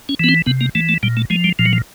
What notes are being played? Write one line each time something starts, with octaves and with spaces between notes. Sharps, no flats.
C#4
E3 B3
C4
C3 B3
A#3
E3 A3
A3
A#2 G3
A3
F3 G#3
G3
A#2 F3
F#3
F3